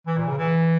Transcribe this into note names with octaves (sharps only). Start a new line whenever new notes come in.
E3
A#2
C#3
E3